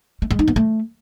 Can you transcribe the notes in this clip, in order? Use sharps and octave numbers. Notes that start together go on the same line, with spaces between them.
A3
G#3
D#4
B3
A3